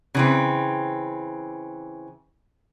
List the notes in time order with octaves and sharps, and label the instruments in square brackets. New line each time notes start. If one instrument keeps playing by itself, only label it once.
[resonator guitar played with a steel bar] C#3 E3 C4